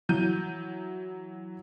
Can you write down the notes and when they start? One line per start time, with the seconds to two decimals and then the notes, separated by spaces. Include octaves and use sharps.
0.09 E3 F#3 G6 D#7